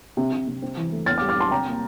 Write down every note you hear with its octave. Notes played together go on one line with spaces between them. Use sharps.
C3
C3
C3
C4
E3
A3
E2 F6 A6
D6 F6
G3
D6 F6
G3 A5 C6
C3 G5 A#5
A#3